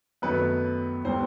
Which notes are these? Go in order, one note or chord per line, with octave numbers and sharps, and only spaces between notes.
F#2 D#3 F#3 A3 B3 B4
A2 G3 B3 C4 C5